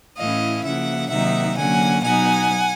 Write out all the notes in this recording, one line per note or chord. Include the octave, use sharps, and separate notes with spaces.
A2 E3 A3 C#4 E4 D#5 F5
C#3 F3 A#3 E5 F#5
C3 D#3 F#3 A#3 D#4 E5 F#5
D3 F#3 A#3 C#4 F#5 G#5
B2 F#3 B3 D#4 F#5 G#5